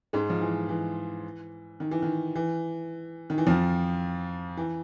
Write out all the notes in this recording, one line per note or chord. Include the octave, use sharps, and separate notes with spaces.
G#2 G#3
F3
E3
E3
D#3
E3
D#3
E3
D#3
E3
F2 F3
E3